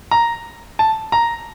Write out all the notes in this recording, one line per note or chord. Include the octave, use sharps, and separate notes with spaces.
A#5
A5
A#5